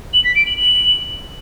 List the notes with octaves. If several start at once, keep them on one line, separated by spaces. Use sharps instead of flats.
F#7
B6
D7
F#7
F#7